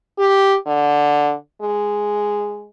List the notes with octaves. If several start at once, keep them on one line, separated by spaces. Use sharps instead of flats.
G4
D3
G#3